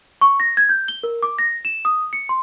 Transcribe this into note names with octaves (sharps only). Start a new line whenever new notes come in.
C#6
A#6
G#6
G6
G7
A#4
D6
A#6
E7
D#6
C#7
C6